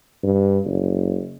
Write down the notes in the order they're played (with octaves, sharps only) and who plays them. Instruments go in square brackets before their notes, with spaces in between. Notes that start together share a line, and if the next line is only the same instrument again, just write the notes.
[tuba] G2
F#1